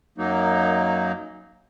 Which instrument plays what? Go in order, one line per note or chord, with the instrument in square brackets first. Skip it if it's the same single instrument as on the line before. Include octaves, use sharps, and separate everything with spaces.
[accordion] F#2 F#3 A#3 D#4